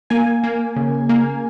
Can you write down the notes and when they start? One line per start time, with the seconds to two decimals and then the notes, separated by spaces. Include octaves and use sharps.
0.10 A#3 G#5
0.44 A#3
0.76 C#3
1.09 A#3